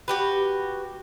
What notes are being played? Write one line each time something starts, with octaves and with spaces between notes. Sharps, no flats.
F#4 G4 B4